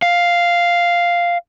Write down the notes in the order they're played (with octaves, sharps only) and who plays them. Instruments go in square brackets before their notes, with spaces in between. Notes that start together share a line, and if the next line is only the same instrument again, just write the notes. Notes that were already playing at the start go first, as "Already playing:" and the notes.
[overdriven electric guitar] F5